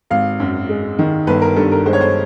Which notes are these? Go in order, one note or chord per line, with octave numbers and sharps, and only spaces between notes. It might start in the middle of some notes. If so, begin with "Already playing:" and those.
G#1 F5
F#2
G#3
D#3
G1 B4
A#4
G2 A4
A#4
G#3 C5
C#5
C5